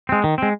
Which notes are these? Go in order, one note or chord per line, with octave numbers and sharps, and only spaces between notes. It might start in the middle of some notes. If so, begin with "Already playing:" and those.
G#3 C4
D#3
G#3 C4